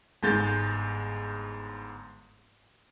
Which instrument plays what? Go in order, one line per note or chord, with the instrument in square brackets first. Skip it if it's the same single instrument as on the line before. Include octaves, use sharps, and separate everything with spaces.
[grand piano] G1 G#2 G#3 G6 A6